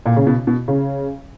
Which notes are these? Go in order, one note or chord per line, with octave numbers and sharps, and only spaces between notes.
A#2
C#3
B2
B2
C#3